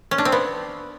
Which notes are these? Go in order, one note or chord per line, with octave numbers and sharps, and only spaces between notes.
C#4
D4
C4
B3